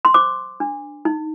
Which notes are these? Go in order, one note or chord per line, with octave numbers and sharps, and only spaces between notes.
C6
C5 D6
D4
D#4